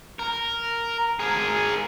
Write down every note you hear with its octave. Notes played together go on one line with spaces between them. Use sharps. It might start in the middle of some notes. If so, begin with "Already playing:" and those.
A#4
G#4 A#4